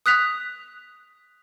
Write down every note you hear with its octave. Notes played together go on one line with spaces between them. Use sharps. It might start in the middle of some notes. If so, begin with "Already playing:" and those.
D#6 F#6 B6 F7